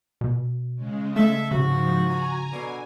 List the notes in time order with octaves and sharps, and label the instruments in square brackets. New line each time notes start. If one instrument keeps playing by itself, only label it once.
[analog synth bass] B2
[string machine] C#3 G#3
[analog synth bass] A3 [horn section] A4 E5
[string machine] G#2 F3 [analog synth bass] C#3 [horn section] F#4
[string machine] G#5 A#5
[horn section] B2 D3 [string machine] G#5